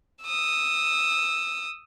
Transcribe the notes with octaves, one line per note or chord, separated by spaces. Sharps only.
D#6 E6